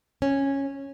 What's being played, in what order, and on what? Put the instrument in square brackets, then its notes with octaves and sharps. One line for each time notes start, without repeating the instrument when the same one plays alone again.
[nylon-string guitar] C#4